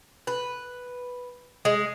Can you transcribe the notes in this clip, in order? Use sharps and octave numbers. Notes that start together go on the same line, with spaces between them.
B4
G#3